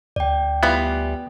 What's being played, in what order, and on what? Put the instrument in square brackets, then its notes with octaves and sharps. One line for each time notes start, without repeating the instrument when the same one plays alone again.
[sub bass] D2 [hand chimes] D5 G5
[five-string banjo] E3 G3 F4 [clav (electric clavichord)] B3